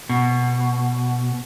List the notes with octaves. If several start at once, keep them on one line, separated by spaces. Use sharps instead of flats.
B2